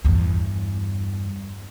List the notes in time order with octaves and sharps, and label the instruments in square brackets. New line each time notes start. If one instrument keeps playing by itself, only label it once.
[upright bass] E2 G2